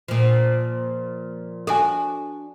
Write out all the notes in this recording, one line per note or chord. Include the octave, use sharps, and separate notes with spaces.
A#2 F3
D4 F#4 A4 G#5